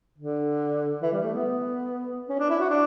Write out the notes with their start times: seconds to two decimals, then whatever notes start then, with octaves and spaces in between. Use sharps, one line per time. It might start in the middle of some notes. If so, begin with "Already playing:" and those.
0.18 D3
1.02 E3
1.12 G3
1.22 A3
1.34 B3
2.29 C#4
2.39 D4
2.49 E4
2.60 F#4
2.70 D4